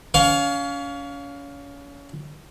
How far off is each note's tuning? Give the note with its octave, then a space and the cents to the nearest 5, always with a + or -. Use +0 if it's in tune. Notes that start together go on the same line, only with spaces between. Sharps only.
C#4 +30 F5 +10